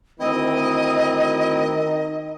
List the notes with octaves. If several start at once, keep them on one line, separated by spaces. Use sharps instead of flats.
D2 D#3 C4 E4 D#5